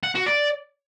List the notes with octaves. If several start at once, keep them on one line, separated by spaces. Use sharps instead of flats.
F#5
F#4
D5